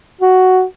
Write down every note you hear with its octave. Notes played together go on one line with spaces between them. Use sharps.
F#4